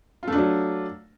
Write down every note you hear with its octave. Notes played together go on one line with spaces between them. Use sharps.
F#3 A3 D4 F4